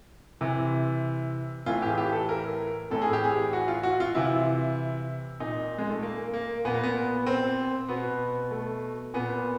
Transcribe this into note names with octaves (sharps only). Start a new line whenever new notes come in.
C3 E3
A2 E3 F4
G4
G#4
G4
A4
A#4
A2 E3 A4
G#4
G4
G#4
F#4
F4
F#4
F4
C3 E3 E4
A#2 D#4
G#3
A3
A#3
A#3
A#2 B3
A#3
B3
C4
B2 B3
A3
A#2 B3